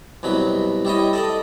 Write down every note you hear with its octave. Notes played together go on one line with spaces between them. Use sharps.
C2 B2 F#3 B5
G3 E4 C#5 D#5
A4 D5 D#5